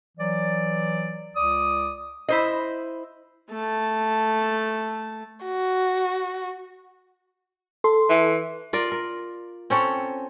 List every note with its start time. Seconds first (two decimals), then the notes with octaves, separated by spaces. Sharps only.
0.18 E3 F#3 D5
1.35 C#2 D5 D6 D#6
2.28 E4 C5 D#5
3.50 A3 A5
5.45 F#4
7.84 A4 C6
8.10 E3
8.73 F4 A#4 D5
8.92 A#4
9.70 C4 C#4 A4 C#5